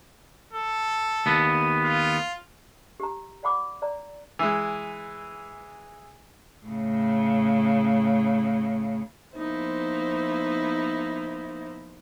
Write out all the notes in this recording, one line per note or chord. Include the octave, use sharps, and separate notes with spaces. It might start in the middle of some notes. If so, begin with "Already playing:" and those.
A4
D#2 B3
F4
G4 A#5
D5 F#5 B5 D6
D5 A#5
E3 G#3
A2 C#3
F3 A#3 B3 D#4 E4 C5